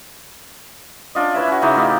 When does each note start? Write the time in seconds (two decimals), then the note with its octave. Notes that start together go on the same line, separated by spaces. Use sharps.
1.15 C#4 D4 F4 D#5
1.34 E4 B4 C#5 E5
1.48 C#4 F#4
1.62 C#3 D#4 E4 D6
1.76 A2 F4 G4 D#5